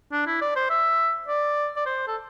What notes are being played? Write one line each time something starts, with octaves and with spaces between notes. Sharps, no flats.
D4
E4
D5
C5
E5
D5
D5
C5
A4